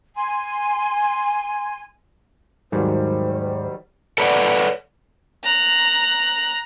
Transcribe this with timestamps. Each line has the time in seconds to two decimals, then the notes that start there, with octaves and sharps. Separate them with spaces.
0.15 G#5 C6
2.72 D#2 G#2 D#3 F#3 G3 C5
4.18 A4 B4 C#5 D5 F#5
5.44 A#5 F#6